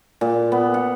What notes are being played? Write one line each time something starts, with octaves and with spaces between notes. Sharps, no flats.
A#2
B3
F#5